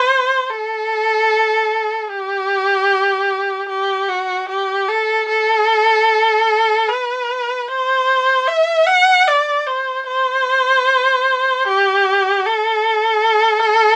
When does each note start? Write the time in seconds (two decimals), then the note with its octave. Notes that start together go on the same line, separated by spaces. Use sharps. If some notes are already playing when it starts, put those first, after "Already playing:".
Already playing: C5
0.50 A4
2.10 G4
3.69 G4
4.09 F#4
4.49 G4
4.88 A4
5.29 A4
6.88 B4
7.68 C5
8.48 E5
8.87 F#5
9.27 D5
9.67 C5
10.07 C5
11.67 G4
12.47 A4